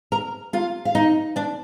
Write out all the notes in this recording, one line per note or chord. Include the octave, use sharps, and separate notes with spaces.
A#4 A#5
F4 F5
F5
D#4 D#5
D4 D5